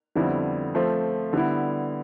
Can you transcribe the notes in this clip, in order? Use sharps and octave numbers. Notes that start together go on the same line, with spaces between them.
F2 D3 G3 B3 E4
F3 A3 C4 F4
D3 G3 B3 E4